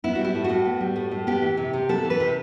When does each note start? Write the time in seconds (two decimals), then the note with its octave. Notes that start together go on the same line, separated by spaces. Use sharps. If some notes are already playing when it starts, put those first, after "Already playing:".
0.04 B3 E4
0.15 G3 F#4
0.24 E4
0.35 A2
0.44 F#4
0.50 A2
0.65 B3
0.81 G3
0.96 A2
1.11 A2
1.27 B3 G4
1.42 E3
1.57 C3
1.73 C3
1.89 B3 A4
2.04 E3
2.10 B4
2.20 C3